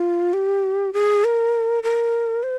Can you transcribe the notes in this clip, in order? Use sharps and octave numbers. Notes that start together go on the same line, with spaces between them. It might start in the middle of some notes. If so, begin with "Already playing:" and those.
Already playing: F4
G4
G#4
A#4
A#4
C5